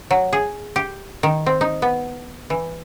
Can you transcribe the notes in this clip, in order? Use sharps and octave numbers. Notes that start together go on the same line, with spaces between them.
F#3
G#4
G4
D#3
C4
D#4
B3
E3